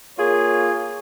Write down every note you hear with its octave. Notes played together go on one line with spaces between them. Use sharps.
A#3 F4 G#4 C#5